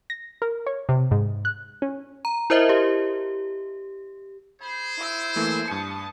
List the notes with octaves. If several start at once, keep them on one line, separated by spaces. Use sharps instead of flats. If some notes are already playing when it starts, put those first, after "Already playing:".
A#6
A#4
C#5
C3
G#2
F#6
C#4
A#5
E4 A#4 C5 D#5 E5
G4
G#4 C5 B5
E4 E6
E3 A3 A#3
G2 A5 D#6 C#7